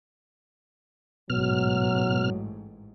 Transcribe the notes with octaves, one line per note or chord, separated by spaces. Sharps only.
A1 G#2 B2 F#3 F6